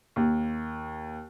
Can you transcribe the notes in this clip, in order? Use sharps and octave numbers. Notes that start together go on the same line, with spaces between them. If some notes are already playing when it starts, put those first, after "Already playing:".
D#2